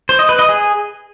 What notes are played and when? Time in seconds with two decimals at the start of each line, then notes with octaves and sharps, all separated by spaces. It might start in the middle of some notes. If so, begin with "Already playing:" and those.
0.09 C5
0.19 D#5
0.29 B4
0.39 D#5
0.49 G#4